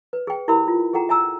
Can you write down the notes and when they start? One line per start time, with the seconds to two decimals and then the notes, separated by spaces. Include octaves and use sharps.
0.13 B4
0.27 G#4 G5
0.48 E4 G4 A#4 E5 B5
0.68 F4
0.93 G#4 A4 F#5 G5 A#5
1.09 E5 G#5 A#5 E6